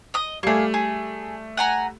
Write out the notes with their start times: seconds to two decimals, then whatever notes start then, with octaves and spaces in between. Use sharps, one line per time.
0.14 D#5 D#6
0.43 G3 A3 A#3 G#4
0.74 G#4
1.57 F#5 G#5 A#5